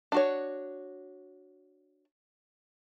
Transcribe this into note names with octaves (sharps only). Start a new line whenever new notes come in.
D4 F#4 C#5